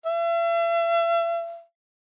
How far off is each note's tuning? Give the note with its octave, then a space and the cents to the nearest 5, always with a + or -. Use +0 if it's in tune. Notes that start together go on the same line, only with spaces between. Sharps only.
E5 +40